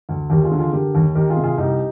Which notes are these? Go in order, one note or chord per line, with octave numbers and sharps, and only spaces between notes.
D2
D#2 G4 A#4
F4 G#4
D3
F4 G#4
D3 G4 A#4
D#2
D#3 G4 A#4
F4 G#4
C3
F4 G#4
C2 D#4 G4